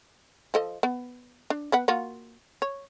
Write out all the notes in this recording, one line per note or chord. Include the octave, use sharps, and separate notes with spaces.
F3 A4 D#5
B3
D4
B3 B4 F#5
A#3 F4 F#4
C#5